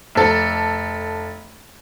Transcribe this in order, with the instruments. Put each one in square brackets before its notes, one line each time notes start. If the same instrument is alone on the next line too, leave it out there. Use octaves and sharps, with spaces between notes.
[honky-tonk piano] F1 A4